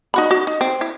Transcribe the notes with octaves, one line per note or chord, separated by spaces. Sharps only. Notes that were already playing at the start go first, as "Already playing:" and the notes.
D#4 F#4 B5
F#4
D#4
C4
E4